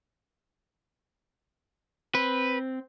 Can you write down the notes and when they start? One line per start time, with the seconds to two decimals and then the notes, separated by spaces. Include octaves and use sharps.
2.15 C4 B4